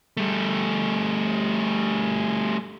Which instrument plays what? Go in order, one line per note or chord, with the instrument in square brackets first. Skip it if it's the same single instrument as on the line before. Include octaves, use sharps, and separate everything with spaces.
[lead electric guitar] G3 A3